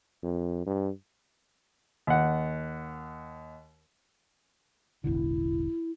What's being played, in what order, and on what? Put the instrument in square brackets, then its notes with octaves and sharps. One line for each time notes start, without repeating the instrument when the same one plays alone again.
[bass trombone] F2
G2
[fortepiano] D#2 F#5
[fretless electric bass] E1 A1 D3 [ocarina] E4